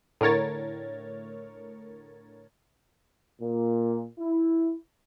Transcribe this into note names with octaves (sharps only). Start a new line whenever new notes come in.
A2 D3 A#4 C#5 A6
A#2
E4